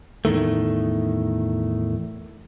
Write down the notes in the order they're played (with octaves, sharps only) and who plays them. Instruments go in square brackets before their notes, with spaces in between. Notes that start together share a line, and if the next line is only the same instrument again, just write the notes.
[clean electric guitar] E2 A2 D#3 A3